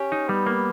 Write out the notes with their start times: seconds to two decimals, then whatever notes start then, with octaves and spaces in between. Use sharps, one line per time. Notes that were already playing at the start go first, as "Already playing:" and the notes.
Already playing: C#4 G4
0.12 D#4
0.29 G3 B3
0.47 A#3